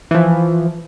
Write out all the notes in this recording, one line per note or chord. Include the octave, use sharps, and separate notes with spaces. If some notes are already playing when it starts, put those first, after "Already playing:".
E3 F3